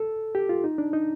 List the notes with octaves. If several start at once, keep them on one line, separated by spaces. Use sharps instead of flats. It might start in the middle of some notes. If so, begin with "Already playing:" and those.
Already playing: A4
G4
F4
D#4
D4
D#4